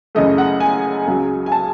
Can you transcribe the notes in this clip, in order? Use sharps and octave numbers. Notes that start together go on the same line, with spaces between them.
F#2 C#3 E3 A3 D#5
F#5
G#5
C#2 C#3 F#3
G#5
A5